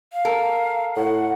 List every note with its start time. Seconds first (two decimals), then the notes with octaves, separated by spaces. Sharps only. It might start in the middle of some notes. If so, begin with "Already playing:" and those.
0.12 F5
0.25 A4 A#4
0.96 A2 F#5